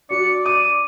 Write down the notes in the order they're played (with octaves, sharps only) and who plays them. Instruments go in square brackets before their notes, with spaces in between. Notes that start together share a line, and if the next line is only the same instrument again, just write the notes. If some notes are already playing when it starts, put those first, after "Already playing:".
[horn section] D4 D5 [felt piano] F#4 [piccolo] C#7
[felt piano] D6 [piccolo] D#7